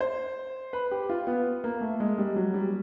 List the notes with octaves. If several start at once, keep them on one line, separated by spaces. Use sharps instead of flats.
C5
B4
G4
F4
B3
A#3
A3
G#3
G3
F#3
G3